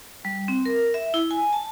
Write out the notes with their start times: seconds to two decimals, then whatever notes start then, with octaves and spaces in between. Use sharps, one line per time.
0.25 G3
0.48 C4
0.65 A#4
0.94 E5
1.14 E4
1.31 G#5
1.53 A5